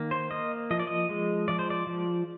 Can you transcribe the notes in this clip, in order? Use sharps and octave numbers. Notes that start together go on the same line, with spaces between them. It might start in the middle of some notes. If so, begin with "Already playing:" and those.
Already playing: D#3 A#3
C5
A#3 D#5
F3 D#5
D5
D#5
G#3
F3 D5
C5
D5
F3